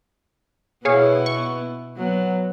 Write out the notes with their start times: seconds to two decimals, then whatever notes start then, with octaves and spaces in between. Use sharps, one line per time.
0.85 B2 B3 E4 G#4 C#5 F5
1.26 C#6
1.96 F#3 B3